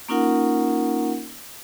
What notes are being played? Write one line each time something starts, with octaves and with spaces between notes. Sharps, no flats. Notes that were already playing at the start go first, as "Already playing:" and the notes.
A#3 C#4 D#4 F4 A#4 F#5